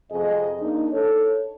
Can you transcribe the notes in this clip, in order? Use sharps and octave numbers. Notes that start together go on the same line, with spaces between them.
F2 C3 G#4 D#5
A#3 D4 D#4
A4 C#5